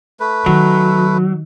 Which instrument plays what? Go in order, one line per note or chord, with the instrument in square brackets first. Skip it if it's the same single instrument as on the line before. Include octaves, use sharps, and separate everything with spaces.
[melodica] A3 B4
[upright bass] D#3 [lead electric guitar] F#3